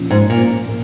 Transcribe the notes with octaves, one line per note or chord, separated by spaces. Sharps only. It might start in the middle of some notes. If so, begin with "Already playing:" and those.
Already playing: A#2 F3 C#4
G#2
A#2
A#2 A#3